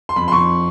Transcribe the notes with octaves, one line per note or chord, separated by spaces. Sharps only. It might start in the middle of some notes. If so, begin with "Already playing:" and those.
C6
F2 B5
C6
F2 C#6